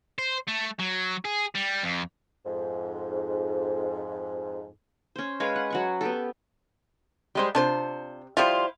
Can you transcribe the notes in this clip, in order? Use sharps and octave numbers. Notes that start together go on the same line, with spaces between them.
C5
A3
F#3
G#4
G3
F2
F2 G#2
C#4 C5
G#3 B4 C#5 F5
F#5
F#3 F#5 C#6
B3 G4 A4
G3 G#3 C5
C3 D4 F4 C5
F3 G3 E4 F4 C5